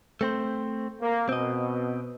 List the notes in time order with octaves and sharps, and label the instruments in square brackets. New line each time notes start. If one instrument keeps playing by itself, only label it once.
[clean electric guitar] A3 C4 C5
[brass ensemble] A#3
[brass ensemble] B2 [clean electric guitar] C4 D#5